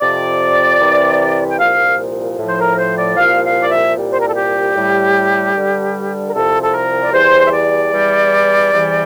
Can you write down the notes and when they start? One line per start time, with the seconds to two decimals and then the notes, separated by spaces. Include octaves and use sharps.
0.01 F2 C3 F3 D5
0.81 C2 C3 E3 G3
1.50 G5
1.59 C2 A#2 F3 F5
2.38 A2 F3
2.47 C5
2.59 A#4
2.78 C5
2.97 D5
3.17 C2 A#2 F3 F5
3.44 F5
3.62 D5
3.70 E5
3.96 C2 A#2 G3
4.12 C5
4.21 A#4
4.29 A4
4.36 G4
4.75 A2 G3
5.54 G2 D3 G3
6.27 A#4
6.34 C2 C3 F3 A4
6.62 A4
6.74 A#4
7.02 D5
7.13 E2 E3 G3 C5
7.45 E5
7.52 D5
7.92 E2 E3 G3
8.72 E2 C3 E3 G3